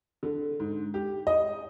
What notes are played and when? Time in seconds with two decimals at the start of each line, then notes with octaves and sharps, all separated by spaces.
0.23 D3
0.60 G#2
0.94 G4
1.27 D#5